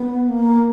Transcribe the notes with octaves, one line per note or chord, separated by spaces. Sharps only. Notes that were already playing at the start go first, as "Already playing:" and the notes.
Already playing: B3
A#3